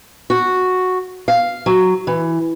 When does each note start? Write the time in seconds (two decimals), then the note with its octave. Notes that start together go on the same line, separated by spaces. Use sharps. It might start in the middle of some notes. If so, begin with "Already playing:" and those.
0.30 F#4
1.28 F5
1.66 F#3
2.07 E3